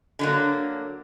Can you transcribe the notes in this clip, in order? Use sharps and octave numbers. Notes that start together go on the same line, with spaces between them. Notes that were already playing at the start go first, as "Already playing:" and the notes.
D3 F#3 A#3